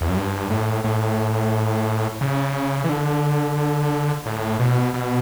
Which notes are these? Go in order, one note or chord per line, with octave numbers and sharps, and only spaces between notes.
E2
F#2
G2
A2
A2
C#3
E3
D3
A2
B2
B2